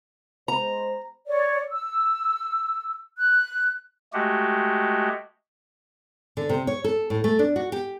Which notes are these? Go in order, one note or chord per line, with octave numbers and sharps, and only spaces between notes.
G#3 C5 A#5
C#5 D5
E6
F#6
G#3 A3 F#4 G4
D3
C3
C#5
A4
A2
A3
D4
F#4
G4